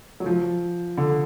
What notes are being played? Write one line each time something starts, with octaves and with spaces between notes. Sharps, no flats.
F#3
F3
D3